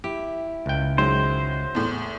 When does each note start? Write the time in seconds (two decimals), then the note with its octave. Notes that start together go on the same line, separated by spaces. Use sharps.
0.04 E4 G4
0.66 C#2 G5
0.98 D#3 F#3 G#3 C5
1.75 E2 A2